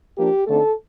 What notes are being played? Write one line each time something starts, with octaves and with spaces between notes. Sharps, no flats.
F3 A#3 D4 G4
D3 A3 C4 D#4 A4